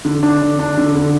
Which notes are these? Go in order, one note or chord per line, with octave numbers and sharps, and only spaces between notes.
D3
D4
D3
D4
D3
D3